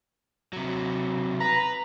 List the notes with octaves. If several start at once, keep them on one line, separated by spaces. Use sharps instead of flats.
C3 F#3
B4 A#5